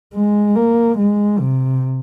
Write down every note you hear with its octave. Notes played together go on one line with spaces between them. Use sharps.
G#3
A#3
G#3
C3